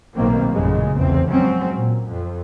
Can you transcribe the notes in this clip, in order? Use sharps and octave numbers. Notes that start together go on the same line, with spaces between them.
B1 A2 D#3 A#3 C4
A1 F#2 A#2 C#3 G#3
F1 B1 E2 C4
F3 F#3 G#3 C4 C#4
A#2
F2